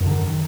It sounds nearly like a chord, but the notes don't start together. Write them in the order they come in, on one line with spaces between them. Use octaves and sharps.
F#2 D3 D#3